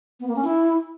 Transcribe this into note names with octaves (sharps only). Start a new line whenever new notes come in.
B3
A#3
C#4
E4